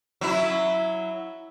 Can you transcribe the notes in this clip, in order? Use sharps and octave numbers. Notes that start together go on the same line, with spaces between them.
F#3 E4